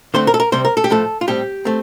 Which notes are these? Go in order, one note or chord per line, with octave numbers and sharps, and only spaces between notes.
D3 A3 C4 C5
A#4
A4
A#4
C3 G3 C4 C5
A#4
A4
G4
A2 F3 A3 A4
F4
A2 G3 C4 G4
A3 C4